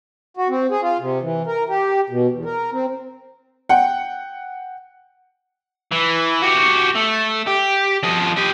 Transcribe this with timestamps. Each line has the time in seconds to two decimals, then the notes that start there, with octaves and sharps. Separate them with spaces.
0.37 F#4
0.49 C4
0.70 G#4
0.82 F4
0.99 C3
1.22 E3
1.46 A#4
1.69 G4
2.09 B2
2.30 E2
2.45 A#4
2.72 C4
3.69 F#5 G5
5.92 E3
6.43 F#4 G4
6.96 A3
7.47 G4
8.03 F3 D#5
8.36 G4 D#5